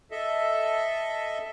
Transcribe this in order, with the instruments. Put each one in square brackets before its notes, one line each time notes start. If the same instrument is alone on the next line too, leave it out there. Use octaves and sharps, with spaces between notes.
[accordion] A4 D#5 E5